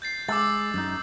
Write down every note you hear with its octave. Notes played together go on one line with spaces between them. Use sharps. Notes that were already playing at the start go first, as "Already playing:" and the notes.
G6 A6 C7
G#3 D6 E6 A6
F#2 D#4